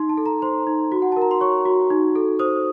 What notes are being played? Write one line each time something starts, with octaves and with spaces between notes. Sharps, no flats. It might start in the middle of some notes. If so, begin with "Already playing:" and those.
Already playing: D#4 C6
A5
A4
A#5
C5 C6
D#4
F#4
F#5
A#4 A5
A#5
C6
C#5 C#6
F#4
D#4
A4
C5 D#6